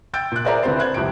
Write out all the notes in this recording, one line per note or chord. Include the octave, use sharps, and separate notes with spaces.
G5 E6 G6 A6 D7
A#2 F#6
G#4 A#4 C5 D5 E5 A#5
D2 C4 E4 B4 C5 A6
C5 F#6 G#6
C2 F2 C3 G4 D7